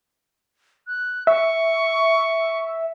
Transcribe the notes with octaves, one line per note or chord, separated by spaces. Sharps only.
F#6
E5 C#6